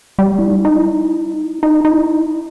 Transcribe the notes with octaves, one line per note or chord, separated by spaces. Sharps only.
G3
E4
D#4
D#4
E4
D#4
E4
D#4
D#4
D#4
E4